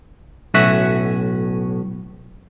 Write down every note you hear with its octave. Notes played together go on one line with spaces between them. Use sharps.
B1 A2 C#4 F#4 E5 F#5